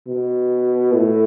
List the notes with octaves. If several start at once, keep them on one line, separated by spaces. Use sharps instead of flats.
B2
A2